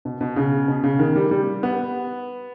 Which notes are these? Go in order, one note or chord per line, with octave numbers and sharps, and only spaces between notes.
B2
B2
C#3
B2
C#3
D#3
G3
G3
B3